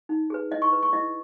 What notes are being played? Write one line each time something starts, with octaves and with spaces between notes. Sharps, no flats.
D#4
G#4 B4
E4 D#5
C#6
B4
C#6
E4 D#5